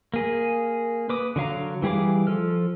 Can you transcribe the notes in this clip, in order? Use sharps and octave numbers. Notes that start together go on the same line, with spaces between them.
A#3 G#4
B4 D6 D#6
D3 F#3 F5 A#5
E3 G3 G#4 F5 D6
F3 A4 F6